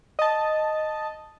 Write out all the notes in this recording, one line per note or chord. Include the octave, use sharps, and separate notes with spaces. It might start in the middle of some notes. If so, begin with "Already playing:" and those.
D#5 A5